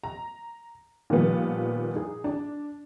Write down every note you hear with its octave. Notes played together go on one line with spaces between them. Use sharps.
A#5
A#2 D#3 F3 G3 B3 F4
D#4 G#4
D4